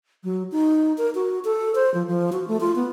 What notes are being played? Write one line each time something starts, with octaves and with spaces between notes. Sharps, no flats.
F#3
D#4
A#4
F#4
A4
C5
F3
F3
F#4
A3
F4
B3